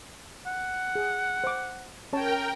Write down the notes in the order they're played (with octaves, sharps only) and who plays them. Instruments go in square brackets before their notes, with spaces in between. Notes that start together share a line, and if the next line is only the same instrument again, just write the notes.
[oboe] F#5
[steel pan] G#4
C5 D6
[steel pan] C#4 C#5 A5 [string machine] A#4 G5